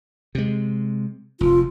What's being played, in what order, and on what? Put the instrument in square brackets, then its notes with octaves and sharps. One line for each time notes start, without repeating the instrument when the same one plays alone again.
[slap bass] C3 G#3
[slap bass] F1 [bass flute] F4